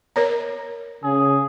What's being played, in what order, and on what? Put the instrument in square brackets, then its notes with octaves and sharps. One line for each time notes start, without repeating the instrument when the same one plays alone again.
[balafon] A#4 C#5 A#5
[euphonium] C#3 [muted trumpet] G#4